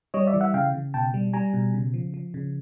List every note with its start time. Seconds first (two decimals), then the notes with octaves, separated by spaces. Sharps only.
0.14 G3 C#5 D#5
0.27 D5 E5
0.34 E3
0.41 E5 F#5
0.54 C#3 F5 G5
0.74 C#3
0.94 B2 G5 A5
1.14 G3
1.33 G3 G#5 A#5
1.54 B2
1.74 C#3
1.94 F3
2.14 F3
2.34 C#3